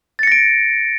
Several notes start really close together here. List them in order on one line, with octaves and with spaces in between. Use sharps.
A6 C#7 A#6 D7